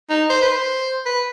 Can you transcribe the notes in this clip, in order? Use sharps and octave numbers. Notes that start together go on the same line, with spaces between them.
D#4
C5
B4
C5
B4